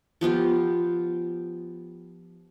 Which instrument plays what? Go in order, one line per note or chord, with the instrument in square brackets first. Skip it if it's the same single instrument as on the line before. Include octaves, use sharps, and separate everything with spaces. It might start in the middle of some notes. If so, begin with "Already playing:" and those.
[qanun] F3 B3 F4 G4